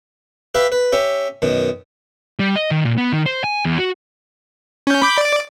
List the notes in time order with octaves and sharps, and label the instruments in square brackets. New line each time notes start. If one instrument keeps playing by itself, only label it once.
[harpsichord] G4 B4 E5 F5
B4
C#4 G4 E5
F#2 B2 D#3
[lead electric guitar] G3
D#5
D#3
A#2
B3
D#3
C5
G#5
E2
F#4
[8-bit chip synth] C#4 G6
B5 D6 G6
D5 D6